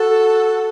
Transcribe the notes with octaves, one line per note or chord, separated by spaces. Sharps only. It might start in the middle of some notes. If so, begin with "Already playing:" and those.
Already playing: F#4 A4